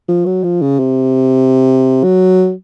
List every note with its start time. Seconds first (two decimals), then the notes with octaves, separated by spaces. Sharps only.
0.09 F3
0.26 F#3
0.44 F3
0.62 C#3
0.79 C3
2.04 F#3